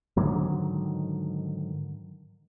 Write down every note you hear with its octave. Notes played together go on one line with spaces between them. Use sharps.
G#2 D3 D#3 F#3